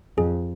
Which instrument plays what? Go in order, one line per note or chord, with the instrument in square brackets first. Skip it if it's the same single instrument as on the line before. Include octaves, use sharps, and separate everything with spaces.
[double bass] F2 [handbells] G#4